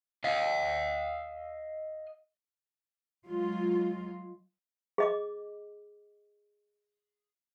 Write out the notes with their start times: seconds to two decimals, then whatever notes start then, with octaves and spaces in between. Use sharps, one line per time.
0.24 D#5 F5
3.25 F#3 G#3 F4
4.98 G#4 D#5 D6